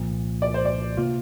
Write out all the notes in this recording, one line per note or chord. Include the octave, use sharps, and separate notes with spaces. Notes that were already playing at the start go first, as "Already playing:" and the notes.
Already playing: C2 A#2 F3
D5
C5
D5
C3 A#3 F4